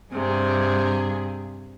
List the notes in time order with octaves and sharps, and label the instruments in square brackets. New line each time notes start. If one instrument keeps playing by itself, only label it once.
[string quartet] G2 C3 G#4